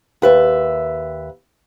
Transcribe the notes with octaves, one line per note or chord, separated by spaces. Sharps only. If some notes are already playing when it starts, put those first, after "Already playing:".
D#2 B4 E5